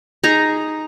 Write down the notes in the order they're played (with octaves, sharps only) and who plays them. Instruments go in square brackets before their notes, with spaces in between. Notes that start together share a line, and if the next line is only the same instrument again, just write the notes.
[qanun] D#4 G#4 A#5